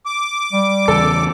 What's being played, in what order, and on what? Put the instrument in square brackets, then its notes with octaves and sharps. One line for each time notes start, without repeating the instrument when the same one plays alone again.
[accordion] D6
[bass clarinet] G3
[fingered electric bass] E2 C#3 [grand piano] A4